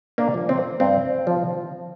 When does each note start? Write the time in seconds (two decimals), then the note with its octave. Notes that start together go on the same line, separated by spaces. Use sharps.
0.18 A#3 D4
0.34 F3
0.49 C4
0.80 G2 C4
1.27 F3